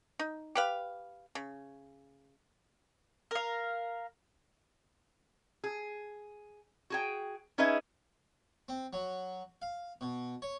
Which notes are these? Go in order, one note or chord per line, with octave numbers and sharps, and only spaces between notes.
D#4
G4 B4 F5
C#3
A#4 F5
G#4
F#4 G#4 G5
C#4 D#4 G#4 B4 D#5 E5
C4
F#3
F5
B2
C#5